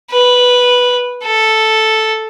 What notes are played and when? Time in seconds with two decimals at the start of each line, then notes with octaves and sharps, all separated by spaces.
0.11 B4
1.24 A4